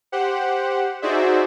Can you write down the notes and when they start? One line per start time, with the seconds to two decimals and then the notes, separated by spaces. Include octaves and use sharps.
0.12 G4 C5 F#5
1.02 D#4 F#4 G#4 C5 D5 E5